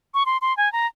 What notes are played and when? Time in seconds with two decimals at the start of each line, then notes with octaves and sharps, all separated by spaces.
0.14 C#6
0.26 C6
0.42 C6
0.57 G#5
0.73 A#5